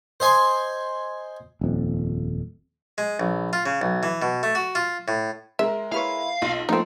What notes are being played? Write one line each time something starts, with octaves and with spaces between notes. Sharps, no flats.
C5 D#5 G#5 C6
D#1 F2
G#3
A#1
F4
C#3
B1
E3
B2
A3
F#4
F4
A2
G#3 A#4 E5
E4 B4 C#5 F5
B1 F4
F3 A3 C4 D#4